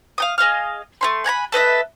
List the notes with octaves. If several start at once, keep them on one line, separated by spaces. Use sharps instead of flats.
F5 G5 D#6
G#4 D#5 F5 F6
A3 C#4 C6
F#5 G#5 A#5 B5
A4 B4 D#5 E5